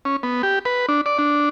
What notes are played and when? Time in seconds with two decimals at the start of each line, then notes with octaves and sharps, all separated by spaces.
0.05 C#4
0.23 B3
0.43 G4
0.65 B4
0.89 D4
1.06 D5
1.19 D4